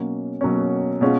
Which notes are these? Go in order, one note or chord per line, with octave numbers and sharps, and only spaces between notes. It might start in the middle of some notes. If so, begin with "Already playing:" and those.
Already playing: B2 F#3 A#3 C#4
B2 F#3 A#3 C#4
B2 G#3 C#4 F4